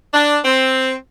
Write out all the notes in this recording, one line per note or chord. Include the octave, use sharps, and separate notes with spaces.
D4
C4